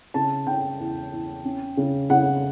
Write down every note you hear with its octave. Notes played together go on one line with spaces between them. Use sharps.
C#3 A5
C#3 G5
E2
E2
C#4
C#3
C#3 F#5